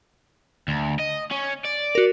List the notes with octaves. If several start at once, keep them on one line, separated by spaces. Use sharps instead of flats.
D2
D#5
C#4
D5
F#4 A#4